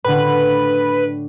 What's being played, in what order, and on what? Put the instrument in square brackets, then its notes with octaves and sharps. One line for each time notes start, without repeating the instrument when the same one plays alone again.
[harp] A2 D3 [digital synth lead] B4